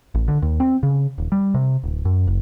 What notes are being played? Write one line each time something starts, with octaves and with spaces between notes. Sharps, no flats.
A1
D3
D#2
C4
C#3
D#1
G3
C3
D1
F#2
F#1